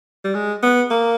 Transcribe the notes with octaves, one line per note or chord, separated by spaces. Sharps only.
G3
G#3
B3
A#3